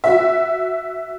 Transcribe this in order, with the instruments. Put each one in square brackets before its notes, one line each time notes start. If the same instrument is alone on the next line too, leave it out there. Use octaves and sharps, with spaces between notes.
[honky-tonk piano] F#4 E5